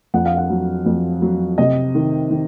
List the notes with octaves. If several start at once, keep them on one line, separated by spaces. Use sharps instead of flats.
F2 F#5
F5
F#5
F#3
F2
F#3
C3 D#5
D#3
D#3